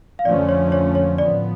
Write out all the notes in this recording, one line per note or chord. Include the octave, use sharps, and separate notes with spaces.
F5
F2 D3 F3 A3 C#4 D5
C#5
C#5
C#5
A2 F3 B3 D5